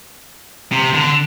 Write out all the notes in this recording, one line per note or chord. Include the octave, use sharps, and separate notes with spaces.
C3
D3